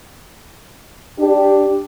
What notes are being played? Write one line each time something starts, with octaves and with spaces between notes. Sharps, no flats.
D4 G4